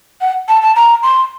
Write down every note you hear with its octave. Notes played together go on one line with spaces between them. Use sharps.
F#5
A5
A5
A#5
C6